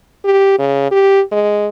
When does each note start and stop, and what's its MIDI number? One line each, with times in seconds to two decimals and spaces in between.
0.25 0.58 67
0.59 0.89 49
0.91 1.21 67
1.32 1.68 56